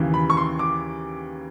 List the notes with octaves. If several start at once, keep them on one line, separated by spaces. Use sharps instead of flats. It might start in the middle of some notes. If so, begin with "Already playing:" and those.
Already playing: D#2 C#3 E3
B5
C#6
C6
D6